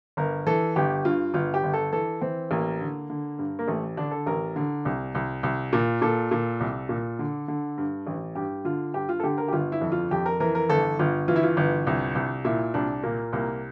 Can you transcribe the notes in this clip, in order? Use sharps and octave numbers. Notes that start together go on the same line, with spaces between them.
G1 A#4
E3 A4
G1 G4
G2 F4
G1 F4
G4
G1
A4
E3 A4
E3 C4
A1 A#3
D3
D3
G2
A#3
A1 A3
D3 D4
A4
A1 A#4
D3
C2
C2
C2
A#2
A#2 A4
A#2
C2
A#2
D3
D3
G2
A1
G2 G4
D3 F4
G2 G4
F4
A4
D3 G4
A#4
G4
G1 F4
E4
F2
F4
F2 G4
A#4
E3 A#4
A#4
G1 A4
G1 F4
E3 F4
E4
F4
G1
C2
C2
A#2 E4
C2 D4
A#2 A#3
C2 A#3